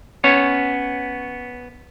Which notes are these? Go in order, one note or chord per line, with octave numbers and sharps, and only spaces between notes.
B3 C#4 C#5